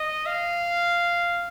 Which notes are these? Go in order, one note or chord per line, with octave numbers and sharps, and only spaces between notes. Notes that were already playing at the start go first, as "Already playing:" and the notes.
Already playing: D#5
F5